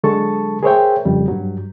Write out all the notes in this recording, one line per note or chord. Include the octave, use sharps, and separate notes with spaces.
D3 F#3 G#3 A4 A5 C#6
G#4 A#4 C5 C#5 E5 G5
F2 C#3 G3
G2 F#3